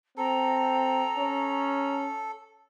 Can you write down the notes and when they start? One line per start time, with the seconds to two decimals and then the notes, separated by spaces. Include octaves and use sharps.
0.18 C4 A4 A#5
1.17 C#4